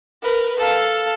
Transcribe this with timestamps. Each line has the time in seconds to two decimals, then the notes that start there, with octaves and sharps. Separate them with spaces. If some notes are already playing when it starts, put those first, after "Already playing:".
0.22 A#4 B4
0.57 A4 F5